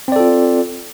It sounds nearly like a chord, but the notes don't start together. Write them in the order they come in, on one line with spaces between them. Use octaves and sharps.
C4 D5 A4 F4